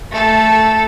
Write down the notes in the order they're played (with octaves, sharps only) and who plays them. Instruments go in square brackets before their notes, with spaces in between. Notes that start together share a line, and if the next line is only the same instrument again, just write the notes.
[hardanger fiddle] A3 A4